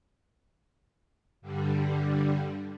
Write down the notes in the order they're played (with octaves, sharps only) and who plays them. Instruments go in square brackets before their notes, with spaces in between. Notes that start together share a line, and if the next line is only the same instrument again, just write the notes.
[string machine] G2 D3 G3